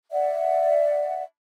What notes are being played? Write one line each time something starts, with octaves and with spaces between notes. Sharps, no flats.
D5 E5 F#5